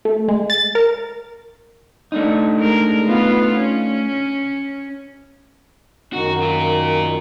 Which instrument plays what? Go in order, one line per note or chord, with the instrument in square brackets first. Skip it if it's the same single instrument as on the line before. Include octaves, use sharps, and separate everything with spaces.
[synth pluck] A3
G#3
A6
A#4
[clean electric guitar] A3 D4 D#4
[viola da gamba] G#3 A#4
B3 F4
C#4
[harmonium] F#2 D#3 D#4 [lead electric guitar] F#4
[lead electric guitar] F4 A#4